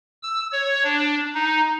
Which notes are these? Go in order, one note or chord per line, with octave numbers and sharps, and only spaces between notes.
E6
C#5
D4
D#4